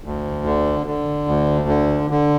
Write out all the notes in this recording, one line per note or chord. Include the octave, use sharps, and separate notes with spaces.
D2
D3
D3
D2
D3
D3